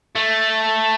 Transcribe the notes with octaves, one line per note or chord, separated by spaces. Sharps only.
A3